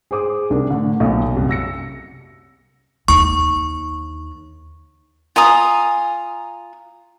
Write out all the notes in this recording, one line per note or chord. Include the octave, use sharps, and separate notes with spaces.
G#4 C5 D6 D#6
C2 D4 A#4
A2 D3
B1 A#2 F#4 A4 D#6
C2 F#2
E6 A#6 C#7
D#2 D3 C#6
F4 G#5 A#5 D#6